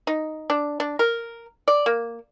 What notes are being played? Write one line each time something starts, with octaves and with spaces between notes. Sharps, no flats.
D#4
D4
D4
A#4
D5
A#3